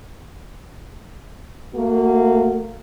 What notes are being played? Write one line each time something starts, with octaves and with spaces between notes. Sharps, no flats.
A3 A#3 F#4